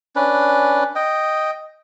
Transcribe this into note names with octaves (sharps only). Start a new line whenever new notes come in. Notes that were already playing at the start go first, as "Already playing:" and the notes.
C#4 D4 B4
D#5 G5